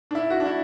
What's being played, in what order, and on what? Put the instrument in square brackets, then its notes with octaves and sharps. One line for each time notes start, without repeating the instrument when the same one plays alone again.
[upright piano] D4
E4
F#4
D4
E4